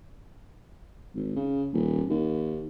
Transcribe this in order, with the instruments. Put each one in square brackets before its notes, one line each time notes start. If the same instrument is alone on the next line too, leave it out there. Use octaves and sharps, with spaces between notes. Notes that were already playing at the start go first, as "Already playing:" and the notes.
[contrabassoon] G#1
C#3
D#1
D#2